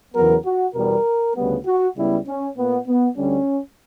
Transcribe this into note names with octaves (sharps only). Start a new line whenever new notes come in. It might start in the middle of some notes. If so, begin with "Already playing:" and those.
E2 C#3 F#3 B3 A#4
F#4
E2 B2 G3 B3 A#4
D2 C#3 G3 B3
F#4
C#2 C#3 G3 B3 E4
C#4
A#2 A#3 B3
B3
D2 D3 G3 C#4